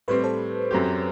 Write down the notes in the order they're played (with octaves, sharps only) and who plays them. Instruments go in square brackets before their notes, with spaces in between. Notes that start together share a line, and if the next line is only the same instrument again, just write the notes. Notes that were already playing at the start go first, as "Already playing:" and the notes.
[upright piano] A2 G3 C4 [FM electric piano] B4
[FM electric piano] A4 C5
[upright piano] F#2 F#3 C4 G4